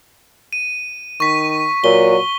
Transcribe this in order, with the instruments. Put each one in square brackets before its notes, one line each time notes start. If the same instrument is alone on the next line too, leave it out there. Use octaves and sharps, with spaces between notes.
[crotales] D#7
[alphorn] D#3 [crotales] C#6 B6
[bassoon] A#2 [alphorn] F#3 [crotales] G7